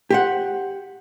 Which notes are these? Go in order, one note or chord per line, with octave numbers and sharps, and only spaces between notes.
G4 C5 F#5